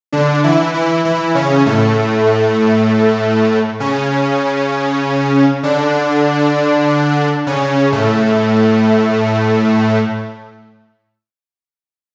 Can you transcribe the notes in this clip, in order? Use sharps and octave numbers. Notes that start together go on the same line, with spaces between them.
D3 D4
E3 E4
E3 E4
E3 E4
C#3 C#4
A2 A3
C#3 C#4
D3 D4
C#3 C#4
A2 A3